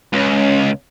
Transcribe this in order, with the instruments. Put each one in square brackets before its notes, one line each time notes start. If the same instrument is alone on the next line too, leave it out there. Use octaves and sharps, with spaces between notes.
[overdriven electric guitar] C#2 [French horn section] C#4